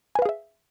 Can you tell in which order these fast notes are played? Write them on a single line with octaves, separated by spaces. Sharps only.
G#5 B4 F5 G#4 E5